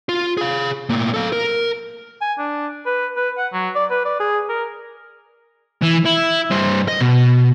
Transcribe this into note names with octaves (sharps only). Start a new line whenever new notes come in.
F4
G#4 F5
A2 A#3
A4 F5
A#4
G#5
D4
B4
B4
F#5
F#3
D5
B4
D5
G#4
A#4
E3
E4
G2 C5
D#5
B2